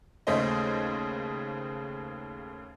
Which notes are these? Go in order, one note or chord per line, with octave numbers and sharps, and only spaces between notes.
D#2 C#3 A3 G#4 C5 D#5